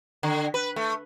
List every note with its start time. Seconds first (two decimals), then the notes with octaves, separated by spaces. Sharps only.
0.23 D3
0.54 B4
0.76 A3